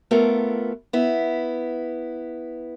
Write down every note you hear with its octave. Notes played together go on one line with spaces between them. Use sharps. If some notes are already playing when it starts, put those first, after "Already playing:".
A3 B3 F4 A4 A#4
B3 E4